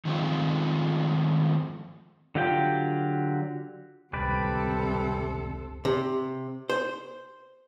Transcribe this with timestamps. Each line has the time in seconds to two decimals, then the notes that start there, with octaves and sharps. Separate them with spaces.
0.05 D#3 F3 G#3 A3 C4 F4
2.35 D3 F#3 F4 G4 G5
4.13 F1 C#2 C3 G3 C4 A4 B4 D5
5.85 C3
6.70 C5